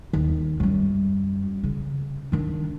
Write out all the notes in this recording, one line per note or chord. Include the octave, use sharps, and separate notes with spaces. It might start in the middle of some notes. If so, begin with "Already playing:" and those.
D#2
F#2 G3
C#3
D#3 D4